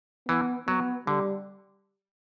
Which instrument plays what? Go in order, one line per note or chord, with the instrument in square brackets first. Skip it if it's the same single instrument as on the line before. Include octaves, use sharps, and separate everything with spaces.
[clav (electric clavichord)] E3 [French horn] B3
[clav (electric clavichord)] F#3 [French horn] B3
[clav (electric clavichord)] D3 [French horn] G3